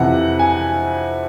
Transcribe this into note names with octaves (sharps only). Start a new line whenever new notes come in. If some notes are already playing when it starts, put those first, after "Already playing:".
Already playing: F2 C3 E3 F#5
G#5